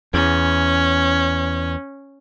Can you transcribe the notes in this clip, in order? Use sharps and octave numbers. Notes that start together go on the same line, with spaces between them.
E2 C#4